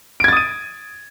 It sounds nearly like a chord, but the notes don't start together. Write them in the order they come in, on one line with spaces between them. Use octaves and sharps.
D7 G#6 A6 D#6 D#7